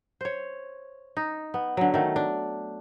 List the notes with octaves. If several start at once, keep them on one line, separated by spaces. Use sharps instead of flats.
C5 C#5
D#4
B3
D3 F#3
D#3 A3
D4